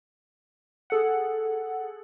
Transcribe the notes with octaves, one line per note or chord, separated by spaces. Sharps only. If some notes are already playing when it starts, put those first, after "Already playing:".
G#4 A4 F#5